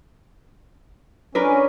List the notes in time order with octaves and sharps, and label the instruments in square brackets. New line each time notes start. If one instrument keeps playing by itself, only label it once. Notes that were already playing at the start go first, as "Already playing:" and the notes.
[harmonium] C#4 [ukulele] D4 A#4 B4